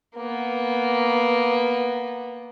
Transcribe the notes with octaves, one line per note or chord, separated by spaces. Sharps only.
A#3 B3